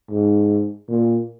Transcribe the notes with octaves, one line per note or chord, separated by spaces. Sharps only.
G#2
A#2